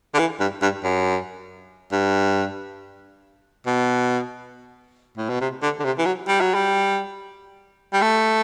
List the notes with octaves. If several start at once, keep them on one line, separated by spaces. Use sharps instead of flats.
D3
E3
G2
G2
F#2
G2
B2
A2
B2
C3
D3
D3
C3
E3
F#3
G3
F#3
G3
G3
A3